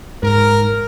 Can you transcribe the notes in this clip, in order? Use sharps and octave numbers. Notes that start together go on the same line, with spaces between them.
G#2 A#4